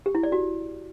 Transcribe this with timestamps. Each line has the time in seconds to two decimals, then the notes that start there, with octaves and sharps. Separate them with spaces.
0.06 G4
0.15 E4
0.23 D5
0.32 F#4